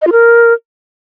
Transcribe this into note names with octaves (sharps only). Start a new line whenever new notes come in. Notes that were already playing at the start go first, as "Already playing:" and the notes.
D#5
F4
A#4